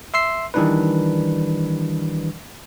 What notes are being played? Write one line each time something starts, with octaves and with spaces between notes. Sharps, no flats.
E5 C6 E6 C7
D#3 E3 G3 D4 D#4 B4